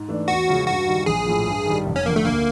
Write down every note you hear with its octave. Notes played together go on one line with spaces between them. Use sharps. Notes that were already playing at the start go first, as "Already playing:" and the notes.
Already playing: G#2
E3 A3 D4
E2 F#4
C#3 F3 G#3 C#4
G2 F#4
D#3 G3
A#1 G#4
A2 F3
G2
D#3 G3
F1
C#4
F2 D3 A#3
A3
D2 A#3